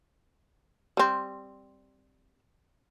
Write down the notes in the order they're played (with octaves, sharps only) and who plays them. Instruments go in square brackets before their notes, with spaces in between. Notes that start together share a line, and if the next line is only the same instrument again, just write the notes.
[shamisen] G3 C4